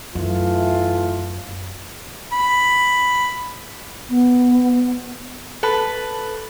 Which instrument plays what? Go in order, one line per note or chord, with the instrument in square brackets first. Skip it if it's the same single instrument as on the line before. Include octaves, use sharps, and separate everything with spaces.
[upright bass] F#2 [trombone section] E3 A3 F4
[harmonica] B5
[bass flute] B3
[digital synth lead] A4 [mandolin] B4